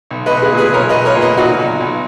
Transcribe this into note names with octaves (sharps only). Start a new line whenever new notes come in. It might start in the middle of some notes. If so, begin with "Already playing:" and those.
B1
B4 D#5
B1
G#4 B4
A#2
G#4 B4
B1 A#4 C#5
B4 D#5
B1
A#4 C#5
A#2
B4 D#5
A#2 D#4 F#4
B1
B1